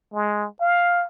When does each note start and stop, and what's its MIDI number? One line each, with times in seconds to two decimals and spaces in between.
0.14 0.47 56
0.61 1.06 77